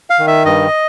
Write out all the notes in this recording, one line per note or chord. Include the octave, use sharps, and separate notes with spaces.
F5
D#3
E5
G2 D#5